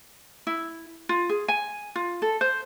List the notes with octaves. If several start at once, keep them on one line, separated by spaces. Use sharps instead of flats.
E4
F4
G#4
G#5
F4
A4
C5